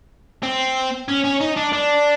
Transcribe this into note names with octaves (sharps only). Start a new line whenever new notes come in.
C4
C#4
C#4
D#4
D4
D4